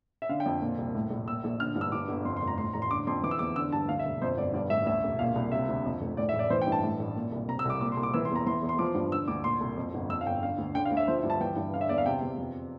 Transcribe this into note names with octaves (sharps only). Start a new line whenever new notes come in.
E5
D3 F5
G5
F2
A#2
C2
A2
A#1
A#2 E6
A#1
D3 F6
G2
E6
G2 D6
G1
F2 C6
C6
F1
A#5
A2 C6
A1 A#5
C6
D3 D6
F2 C6
E3 D6
E6
E2 D6
D3 E6
G2 A5
D2 F5
E5
E1
F2 C5
G1 D5
G2 D5
A1 E5
D2 E5
E1
A#2 F5
C2
C3 E5
D2
F2
F1
A2 D5
E5
A1
D5
E3 C5
G5
G2
A5
A2
A1
A#2
C2
C3 A#5
E6
C2 D6
A#2 D6
C6
C2
D6
E3 E6
C6
E2
A#5
E3 C6
E2
C6
F3 D6
G2
D3 E6
D2 D6
A#2 C6
C2
F2
G1
F2 E6
F5
G1 G5
D3 F5
D2
D3 G5
F5
D2
E5
F3 C5
E5
G2
A5
E3 G5
G2
D3 F5
E5
E2 D5
F5
C3 G5
E2
F2